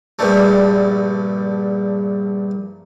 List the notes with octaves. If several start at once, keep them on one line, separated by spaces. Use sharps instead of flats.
A#1 G2 A#2 A3